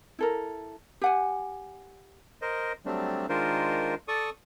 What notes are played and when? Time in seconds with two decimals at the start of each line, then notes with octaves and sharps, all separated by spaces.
0.19 E4 A4 A#4
1.01 G4 F#5 G#5
2.42 A#4 C5 D#5
2.85 F#3 G3 A3 C4 D4
3.29 D#3 G#3 D4 F4 A#4 C5
4.08 A4 D5 C#6 D#6